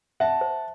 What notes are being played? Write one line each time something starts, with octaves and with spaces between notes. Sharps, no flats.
E5 F#5 A5
C5